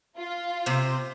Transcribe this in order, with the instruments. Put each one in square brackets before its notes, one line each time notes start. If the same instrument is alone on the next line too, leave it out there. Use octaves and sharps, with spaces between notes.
[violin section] F4
[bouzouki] C3 C5